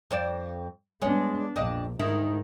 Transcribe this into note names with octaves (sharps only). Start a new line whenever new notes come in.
F2 C5 D5
G#3 B3 D4 C#5
A#1 F2 D4 D#5
D2 G#2 D#3 E4